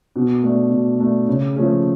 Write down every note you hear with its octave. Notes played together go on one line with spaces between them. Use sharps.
B2
A3 D4
B2
A3 D4
C#3
F3 A3 C#4 G#4